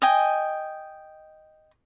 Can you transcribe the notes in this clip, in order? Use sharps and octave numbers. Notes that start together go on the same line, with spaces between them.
D#5 G5 G#5